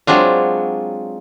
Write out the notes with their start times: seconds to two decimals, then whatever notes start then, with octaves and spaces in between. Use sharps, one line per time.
0.07 F#3 G#3 C4 D4 F4